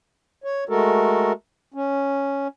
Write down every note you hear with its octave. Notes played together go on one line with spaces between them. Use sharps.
C#5
G#3 A3 F#4 A4 A#4
C#4